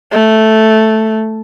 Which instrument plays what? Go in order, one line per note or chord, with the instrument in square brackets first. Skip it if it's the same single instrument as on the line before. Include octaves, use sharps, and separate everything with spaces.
[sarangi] A3